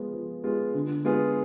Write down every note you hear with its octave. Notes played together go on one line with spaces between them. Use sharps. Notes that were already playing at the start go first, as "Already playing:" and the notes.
Already playing: F3 G#3 B3 F4
F3
G#3 B3 F4
D3
G#3 B3 F4 G#4